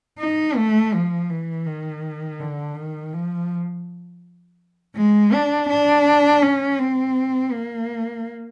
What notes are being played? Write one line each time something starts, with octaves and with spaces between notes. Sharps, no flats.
D#4
A3
F3
E3
D#3
D3
D#3
F3
G#3
D4
D4
C#4
C4
A#3